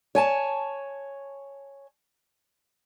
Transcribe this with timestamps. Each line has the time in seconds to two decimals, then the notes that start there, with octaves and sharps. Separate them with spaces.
0.15 C#5 G#5 A5